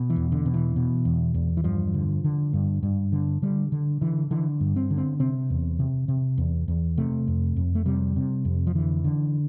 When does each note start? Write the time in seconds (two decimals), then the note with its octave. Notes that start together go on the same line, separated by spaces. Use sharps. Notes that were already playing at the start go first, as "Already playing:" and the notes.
Already playing: B2
0.10 E3
0.16 E2
0.32 D3
0.46 B2
0.54 E3
0.76 B2
1.05 E2
1.34 E2
1.57 E3
1.64 G2 F3
1.94 D3
2.24 D3
2.53 G2
2.83 G2
3.12 D3
3.42 D3 G3
3.72 D3
4.01 D3 E3
4.31 D3 E3
4.60 G2
4.76 C4
4.90 D3
4.97 C4
5.20 C3 C4
5.50 E2
5.79 C3
6.08 C3
6.38 E2
6.68 E2
6.97 C3 A3
7.28 F2
7.56 F2
7.75 A3
7.86 C3 G3
8.16 C3
8.45 F2
8.67 F3
8.75 D3 E3
9.04 D3